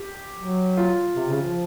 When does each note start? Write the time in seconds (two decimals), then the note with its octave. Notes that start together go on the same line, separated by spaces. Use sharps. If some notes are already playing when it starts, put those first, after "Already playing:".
Already playing: G4
0.38 F#3
0.77 F4
1.16 C3
1.29 C#3
1.42 F3